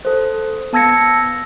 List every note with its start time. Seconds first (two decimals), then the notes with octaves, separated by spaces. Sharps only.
0.05 A4 C5
0.73 B3 A5 E6 G#6 A#6 C#7